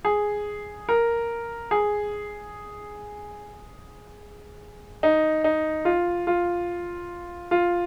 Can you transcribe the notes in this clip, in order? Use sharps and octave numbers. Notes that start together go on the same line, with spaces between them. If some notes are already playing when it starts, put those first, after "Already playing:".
G#4
A#4
G#4
D#4
D#4
F4
F4
F4